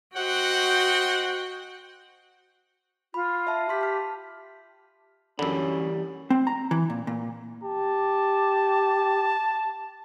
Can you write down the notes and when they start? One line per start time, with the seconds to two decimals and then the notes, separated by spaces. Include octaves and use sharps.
0.16 F#4 C5 D#5 F#5 G5
3.14 F4 B5
3.47 E5 A5
3.69 G4 C6 B6
3.81 A5 F6
5.39 F#2 D3 E3 G3 C#4 B5
6.30 C4
6.47 A#5
6.71 E3
6.90 A#2
7.07 A#2
7.63 G4 A5